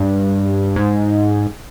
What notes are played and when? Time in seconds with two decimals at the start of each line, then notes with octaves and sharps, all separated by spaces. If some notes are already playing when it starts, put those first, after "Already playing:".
Already playing: G2
0.76 G#2